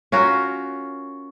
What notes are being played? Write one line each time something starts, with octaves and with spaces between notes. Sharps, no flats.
C#4 F4 F#4 A#4